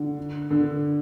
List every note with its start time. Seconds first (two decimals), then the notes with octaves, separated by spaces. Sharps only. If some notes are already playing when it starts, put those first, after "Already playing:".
Already playing: D3
0.51 D3